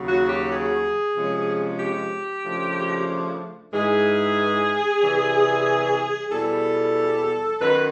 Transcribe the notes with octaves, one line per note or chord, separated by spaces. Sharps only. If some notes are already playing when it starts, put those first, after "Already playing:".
Already playing: D#2 C#3 F#3
F#4
G4
G#4
C3 F3 G#3 C#4
G4
C#3 F3 A3 D4
G#2 E3 G#3 G#4
C3 E3 G3
E2 B2 G3 A4
F#2 D#3 F#3 B4